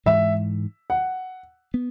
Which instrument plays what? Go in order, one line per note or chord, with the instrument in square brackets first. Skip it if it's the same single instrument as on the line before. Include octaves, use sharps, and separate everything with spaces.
[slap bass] G#2 E3 G#3 [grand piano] E5
[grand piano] F#5
[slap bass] B3